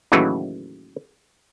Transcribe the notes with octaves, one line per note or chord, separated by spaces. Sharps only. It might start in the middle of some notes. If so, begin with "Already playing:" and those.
D#2 A2 C#3 E3 F#3